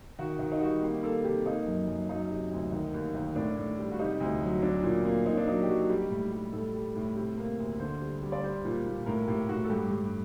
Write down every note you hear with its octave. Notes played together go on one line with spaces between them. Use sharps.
D#3 F#4
D#3 F#4
D#4
G3 F#4
A#3 G4
A#3 A4
C3 G4
A#3 D#4
F#2
F#2
F#3 D#4
C3
D2
D#3
D#2
D#3
A2 D4
A2
G3
F#4
C3 D#4
D2
F#3
F#3 D4
A#2
A#3
A#3 D#4
D4
F#3 D#4
G4
F#3 F#4
G3 G4
A2
G3
A2 A4
G3
A2
C3
A#3
D2
D3 C5
G3
G3
D5
G3 C5
A#2
A#2
A2 A#4
A2 G4
A2 F#4
A4
G2 G4
G2